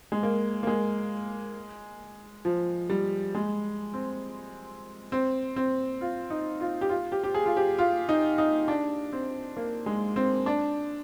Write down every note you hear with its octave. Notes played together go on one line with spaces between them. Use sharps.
G#3
A#3
A#3
G#3
F3
G3
G#3
C4
C4
C4
F4
D#4
F4
G4
F4
G4
G4
G#4
F4
G4
F4
D#4
D#4
D4
C4
A#3
G#3
C4
D4